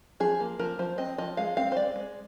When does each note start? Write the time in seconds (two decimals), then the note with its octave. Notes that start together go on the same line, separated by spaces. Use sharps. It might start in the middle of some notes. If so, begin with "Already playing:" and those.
0.20 F3 G#4
0.40 A#3
0.59 F3 A#4
0.79 F3 C5
0.98 C4 D#5
1.18 F3 D#5
1.37 G#3 F5
1.57 C4 F5
1.72 C5
1.77 G#3 D5
1.96 G#3